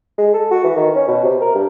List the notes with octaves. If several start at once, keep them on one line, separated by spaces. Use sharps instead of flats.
G#3
A4
F#4
E3
D#3
C#4
B2
C3
A#4
G2